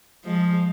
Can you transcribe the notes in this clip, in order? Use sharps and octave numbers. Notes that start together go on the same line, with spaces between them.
F3 G#3